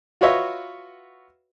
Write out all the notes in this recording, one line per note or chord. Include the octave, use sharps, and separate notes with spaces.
F4 F#4 B4 C#5 D#5 E5